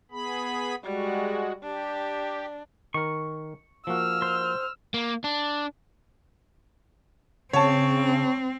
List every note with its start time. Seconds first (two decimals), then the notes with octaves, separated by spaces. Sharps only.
0.11 B3 G#4 B5
0.84 G3 G#3 F#4
1.63 D4 G4
2.94 D#3 A#4 C#6
3.87 F3 A#3 F#4 E6 F6
4.22 C5
4.94 A#3
5.24 D4
7.53 C#3 C4 C#5 A5